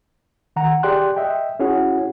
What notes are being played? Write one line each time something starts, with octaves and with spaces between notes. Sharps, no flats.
D#3 F#5 A#5
G4 G#4 D5 G5 C6 F#6
D#5 E5 G5
C#4 E4 F#4 G#4 C#5 F#5